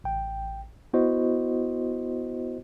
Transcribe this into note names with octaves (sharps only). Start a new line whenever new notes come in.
A1 G5
B3 E4 F#4 C5 D#5